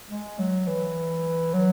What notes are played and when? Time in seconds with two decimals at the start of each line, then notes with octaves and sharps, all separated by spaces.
0.10 G#3
0.39 F#3
0.67 E3
1.54 F#3